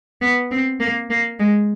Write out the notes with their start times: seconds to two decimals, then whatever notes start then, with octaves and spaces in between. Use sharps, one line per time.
0.21 B3
0.51 C4
0.80 A#3
1.10 A#3
1.39 G#3